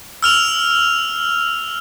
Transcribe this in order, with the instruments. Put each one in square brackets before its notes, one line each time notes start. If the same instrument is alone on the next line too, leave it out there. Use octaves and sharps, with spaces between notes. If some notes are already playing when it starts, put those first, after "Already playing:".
[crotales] E6 F6 F7